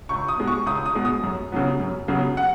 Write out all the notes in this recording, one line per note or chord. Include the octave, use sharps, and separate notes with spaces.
C#2 C#6
D#6
B2 G#3
C#6
C#2 D#6
D#6
B2 G#3
D#6
F#2
C#3 F#3 B3
F#2
C#3 F#3 B3
F#5